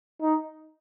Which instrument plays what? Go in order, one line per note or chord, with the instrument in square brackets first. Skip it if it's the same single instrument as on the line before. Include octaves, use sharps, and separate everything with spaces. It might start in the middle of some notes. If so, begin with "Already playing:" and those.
[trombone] D#4